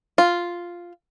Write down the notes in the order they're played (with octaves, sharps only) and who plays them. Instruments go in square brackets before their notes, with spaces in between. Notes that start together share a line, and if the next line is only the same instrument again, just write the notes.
[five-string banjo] F4